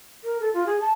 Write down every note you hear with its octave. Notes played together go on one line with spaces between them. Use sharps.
A#4
A4
F4
G#4
A5